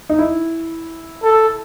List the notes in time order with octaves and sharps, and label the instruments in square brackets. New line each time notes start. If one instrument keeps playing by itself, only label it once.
[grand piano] D#4
E4
[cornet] A4